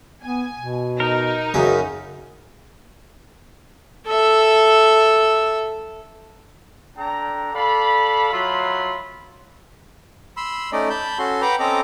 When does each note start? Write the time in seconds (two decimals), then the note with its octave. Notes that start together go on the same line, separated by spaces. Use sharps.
0.23 B3 G#5
0.59 B2
1.00 D#4 A#4
1.54 F#2 C#3 G#4
4.07 A4 E5
6.97 D4 A4 G5 A#5
7.54 A4 D5 F5 B5
8.32 F#3 F4 E5 B5 C6
10.37 B5 C6 E6
10.72 A3 C#4 D#4 D5 D#5
10.90 A5 B5 G6
11.19 C#4 F#4 A4 C6
11.42 B4 F#5 G5 A#5 B5 D6
11.59 C4 C#4 A4 D#5 A#5 D6